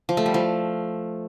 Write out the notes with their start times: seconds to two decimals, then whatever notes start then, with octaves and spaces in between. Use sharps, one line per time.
0.09 F3
0.17 A3
0.26 G3
0.34 F3